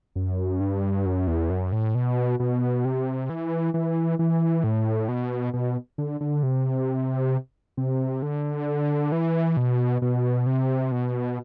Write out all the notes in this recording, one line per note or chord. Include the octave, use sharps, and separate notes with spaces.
F#2
G2
F#2
E2
F#2
A2
B2
B2
C3
E3
E3
E3
A2
B2
B2
D3
D3
C3
C3
D3
E3
B2
B2
C3
B2